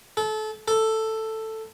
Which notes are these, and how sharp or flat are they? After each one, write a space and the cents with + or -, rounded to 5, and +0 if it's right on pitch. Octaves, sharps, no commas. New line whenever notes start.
A4 -30
A4 +5